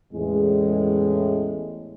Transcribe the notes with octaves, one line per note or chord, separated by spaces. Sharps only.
A1 E2 A2 G#3